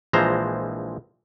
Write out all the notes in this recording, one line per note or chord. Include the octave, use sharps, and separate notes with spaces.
A#1 E3 F3 G#3 C5 A#5